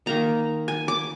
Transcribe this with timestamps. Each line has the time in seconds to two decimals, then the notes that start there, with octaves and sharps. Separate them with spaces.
0.06 D#3 A#3 D#4 A#5
0.68 G#5
0.88 D6